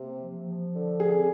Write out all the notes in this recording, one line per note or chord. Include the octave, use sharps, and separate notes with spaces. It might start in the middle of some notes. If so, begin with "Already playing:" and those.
Already playing: C3 A#3
F3
F3
D3
C4 G#4